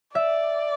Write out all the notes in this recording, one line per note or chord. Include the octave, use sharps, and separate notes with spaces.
D5 E5